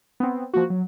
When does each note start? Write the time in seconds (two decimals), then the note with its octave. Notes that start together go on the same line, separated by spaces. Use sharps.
0.20 B3 C4
0.54 F3 A#3 F#4
0.70 F#3